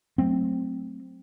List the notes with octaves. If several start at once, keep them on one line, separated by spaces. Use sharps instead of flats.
F#3 A3 C4